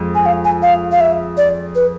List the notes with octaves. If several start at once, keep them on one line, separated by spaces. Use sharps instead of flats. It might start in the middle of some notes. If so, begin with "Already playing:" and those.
Already playing: F2 G#3
G#5
F5
G#5
F5
F5
E5
D5
B4